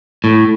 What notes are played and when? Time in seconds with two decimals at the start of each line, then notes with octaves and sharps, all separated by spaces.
0.24 A2